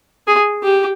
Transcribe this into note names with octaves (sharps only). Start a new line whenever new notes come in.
G#4
G4